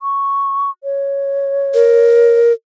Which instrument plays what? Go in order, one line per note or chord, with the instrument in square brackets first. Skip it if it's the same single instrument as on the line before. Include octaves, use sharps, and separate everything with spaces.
[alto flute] C#6
C#5
[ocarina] A#4